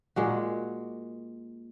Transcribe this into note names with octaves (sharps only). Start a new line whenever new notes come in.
A#2 G#3 F#4